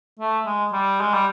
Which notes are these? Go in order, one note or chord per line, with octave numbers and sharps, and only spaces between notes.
A3
G#3
G3
G#3
G3